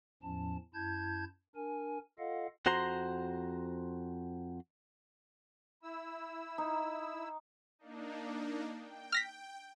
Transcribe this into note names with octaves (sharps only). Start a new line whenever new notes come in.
E2 A2 F3 C#4 A5
F#2 E4 A5 G6 G#6
D4 A#4 G#5
F4 A4 D#5 F5 F#5
F2 F#4 C5 A#5 C6
E4 E6
D#4
A#3 D4 D#4
G5
F6 A#6 B6